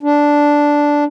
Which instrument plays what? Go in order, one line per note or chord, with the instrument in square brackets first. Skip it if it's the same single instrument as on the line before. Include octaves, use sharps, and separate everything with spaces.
[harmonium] D4